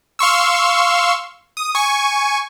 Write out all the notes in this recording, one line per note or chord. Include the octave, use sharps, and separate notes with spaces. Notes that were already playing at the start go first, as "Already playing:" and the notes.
F5 C6 C#6 E6
D#6
G#5 C#6